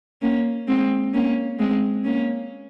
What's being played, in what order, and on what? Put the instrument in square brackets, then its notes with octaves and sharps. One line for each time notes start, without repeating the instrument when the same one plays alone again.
[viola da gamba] A#3 C#4
G#3 C4
A#3 C#4
G#3 C4
A#3 C#4